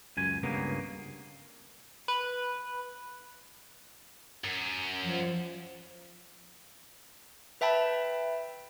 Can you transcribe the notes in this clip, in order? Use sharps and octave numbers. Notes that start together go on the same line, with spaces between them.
C#2 F#2 G#5
C#2 G2 C#3 A#3 B3
B4
F#2
F3
B4 E5 G5 A5 B5